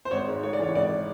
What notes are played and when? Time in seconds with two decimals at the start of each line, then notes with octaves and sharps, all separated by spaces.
0.05 C5
0.11 G#1 C#5
0.28 G#2
0.43 A3 C#5
0.53 D5
0.59 E3 C#5
0.75 G#1 D5